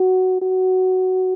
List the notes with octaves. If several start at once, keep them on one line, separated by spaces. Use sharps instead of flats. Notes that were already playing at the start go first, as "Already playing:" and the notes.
Already playing: F#4
F#4